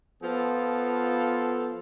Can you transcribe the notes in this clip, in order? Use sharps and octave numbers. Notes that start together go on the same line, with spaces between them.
F3 B3 F4 A4